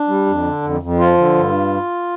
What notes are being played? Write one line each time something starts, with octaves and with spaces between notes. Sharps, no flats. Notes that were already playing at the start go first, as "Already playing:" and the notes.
Already playing: D4
G3
F2
D3
F2
F2
F3 F4
D3
G2